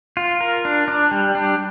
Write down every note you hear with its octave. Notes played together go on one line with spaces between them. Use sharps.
F4
A#4
D4
D4
G3
D4